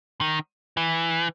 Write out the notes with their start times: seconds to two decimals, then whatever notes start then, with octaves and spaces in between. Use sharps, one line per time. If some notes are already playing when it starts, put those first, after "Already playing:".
0.21 D#3
0.77 E3